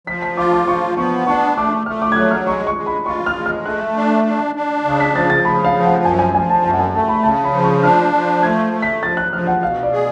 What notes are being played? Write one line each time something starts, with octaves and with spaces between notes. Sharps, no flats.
F3 B6
B6
F4 D6
D6
F3 C#6
B3 C#6
D4 C#6
A3 D6
A3 F6
D6
G#6
F#3 F#6
F6
G#3 C#6
C#6
G#3
B5
F4 C#6
F6
G#3
F6
A3 F#6
D4
D4
D4
C#3
B6
F3 A6
A6
C#3 B5
F5
F3
F#5
F#2 G#5
G#5
F3 G#5
A5
F#2 A5
F#5
G#5
A3 A5
B5
C#3 A5
B5
F3
C#6
D4 F6
F3
A3 G#6
A3
B6
F3 A6
F#6
F3 F6
F#5
B2 F5
D5
G#4